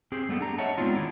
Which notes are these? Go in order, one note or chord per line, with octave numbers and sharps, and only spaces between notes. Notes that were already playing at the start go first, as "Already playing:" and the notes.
C4 G4 G#4
G3 A3 B3 A4
D4 G4 A#5
C#5 D#5 E5 F#5 A5
G#3 B3 C4 D4 D#4 F4
D#3 E4 G4